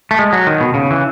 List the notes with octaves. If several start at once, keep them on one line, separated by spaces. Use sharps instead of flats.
A3
G#3
F#3
D#3
B2
C#3
E3